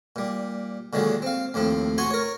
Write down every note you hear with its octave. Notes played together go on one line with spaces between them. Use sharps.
A#2 G3
A#2 D3 D#3 F#3 G#3
C4 F5
D#2 A2 F3 C4
F#4 F#5 G#5 C6 C#6
A#4 C#5